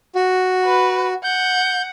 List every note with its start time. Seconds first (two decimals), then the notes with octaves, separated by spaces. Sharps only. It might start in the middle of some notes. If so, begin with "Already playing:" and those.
0.15 F#4
0.65 B4
1.24 F#5 G6